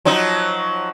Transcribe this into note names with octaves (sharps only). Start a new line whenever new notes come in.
F3 F#3 D#4